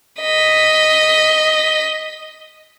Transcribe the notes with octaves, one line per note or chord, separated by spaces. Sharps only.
D#5 B6